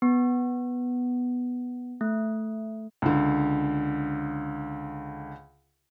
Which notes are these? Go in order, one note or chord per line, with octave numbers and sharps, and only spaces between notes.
B3
A3
C#2 D3